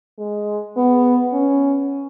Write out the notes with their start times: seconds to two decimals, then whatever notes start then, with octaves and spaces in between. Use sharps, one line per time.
0.18 G#3
0.77 B3
1.33 C#4